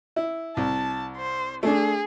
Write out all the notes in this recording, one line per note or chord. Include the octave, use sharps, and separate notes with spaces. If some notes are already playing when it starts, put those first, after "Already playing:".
E4
C2 A5
C5
A3 D4 G#4